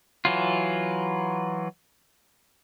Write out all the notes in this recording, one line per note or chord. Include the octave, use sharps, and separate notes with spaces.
E3 F#3 F4